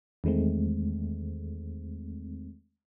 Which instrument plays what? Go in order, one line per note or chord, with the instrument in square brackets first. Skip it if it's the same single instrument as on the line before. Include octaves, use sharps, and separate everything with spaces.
[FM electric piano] E2 D#3 G#3 A3 C4